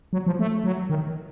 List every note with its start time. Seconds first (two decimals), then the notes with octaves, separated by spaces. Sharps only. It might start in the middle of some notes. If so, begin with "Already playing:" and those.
0.13 F#3
0.27 F3
0.39 A3
0.64 F#3
0.90 D#3